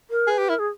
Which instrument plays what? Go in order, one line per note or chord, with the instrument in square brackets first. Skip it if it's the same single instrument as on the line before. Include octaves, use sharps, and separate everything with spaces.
[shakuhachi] A#4
[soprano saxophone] G#4 [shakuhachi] B4
[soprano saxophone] G4
[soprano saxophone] E4 [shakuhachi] A#4
[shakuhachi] G#4